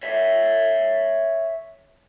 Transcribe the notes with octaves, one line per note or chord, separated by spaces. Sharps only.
C#5 E5